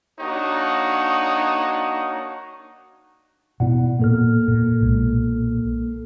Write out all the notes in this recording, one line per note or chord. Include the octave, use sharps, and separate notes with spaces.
A#3 D4 D#4 F#4 C#5
B2 B3 E4 D5 F#5
A#2 A#3 B3 A4 F6
A#2
B1 A#2 G#3